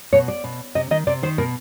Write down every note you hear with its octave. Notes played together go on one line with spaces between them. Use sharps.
B2 C#5
D5
B2
C3 D#5
D#3 D#5
C3 D5
D#3 C5
B2 A#4